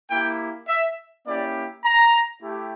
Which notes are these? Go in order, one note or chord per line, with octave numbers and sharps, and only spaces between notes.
A#3 E4 G4 G5
E5
A#3 C#4 E4 G4 D5
A#5
A3 E4 G4